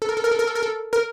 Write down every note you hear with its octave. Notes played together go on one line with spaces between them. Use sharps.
A4
A#4
A4
A#4
A4
A#4
A4
A#4
A4
A#4